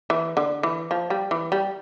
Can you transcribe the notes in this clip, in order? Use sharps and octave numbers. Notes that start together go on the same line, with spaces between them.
E3
D3
E3
F3
G3
E3
G3